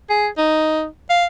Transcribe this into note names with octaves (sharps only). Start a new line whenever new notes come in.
G#4
D#4
F5